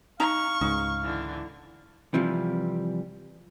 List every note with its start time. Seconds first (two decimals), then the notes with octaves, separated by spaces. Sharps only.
0.20 D#4 F5 A#5 C#6
0.61 C#2 G#2 D#4
1.02 D3 E3
2.14 C3 E3 F3 G3